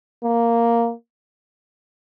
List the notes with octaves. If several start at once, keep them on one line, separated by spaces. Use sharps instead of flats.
A#3